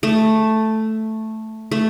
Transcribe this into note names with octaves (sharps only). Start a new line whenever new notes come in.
A3
A3